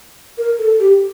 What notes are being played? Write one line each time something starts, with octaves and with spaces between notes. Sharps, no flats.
A#4
A4
G4